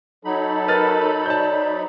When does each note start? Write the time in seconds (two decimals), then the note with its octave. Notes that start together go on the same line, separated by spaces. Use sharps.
0.25 F#3 D#4 A4 C#5 F#5 B5
0.68 A#4 B4 F6 A6
1.26 C5 D5 A5 G6